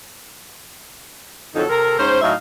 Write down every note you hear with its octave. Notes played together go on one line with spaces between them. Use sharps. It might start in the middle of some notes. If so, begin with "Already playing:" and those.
F2 D3 F#3 D#4 A4
C3 A4 A#4
G#2 C#4 C5
A2 F#3 D#4 E5 F5